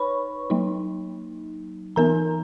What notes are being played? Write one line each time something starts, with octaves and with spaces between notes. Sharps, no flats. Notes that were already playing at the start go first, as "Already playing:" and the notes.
Already playing: D#4 B4 C#5 B5 C#6
F#3 A#3 D#4
E3 B3 D#4 A#4 A#5